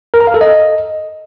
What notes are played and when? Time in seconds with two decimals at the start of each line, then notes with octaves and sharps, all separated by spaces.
0.14 A#4
0.20 A#5
0.27 F5
0.34 A4
0.41 D#5